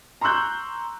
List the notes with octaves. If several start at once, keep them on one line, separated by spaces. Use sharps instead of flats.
A#5 C6 C#6 E6 F#6 G6